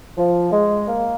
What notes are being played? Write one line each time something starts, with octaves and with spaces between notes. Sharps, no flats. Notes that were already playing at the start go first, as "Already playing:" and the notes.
F3
G#3
A#3